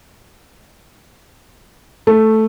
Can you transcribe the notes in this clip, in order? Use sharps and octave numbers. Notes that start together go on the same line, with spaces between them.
A3